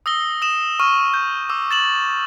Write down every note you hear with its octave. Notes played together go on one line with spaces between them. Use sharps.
D#6 E6 A#6 G7
D#6 E7
C#6 F6 D#7
G6
D6 E6
A6 E7 F#7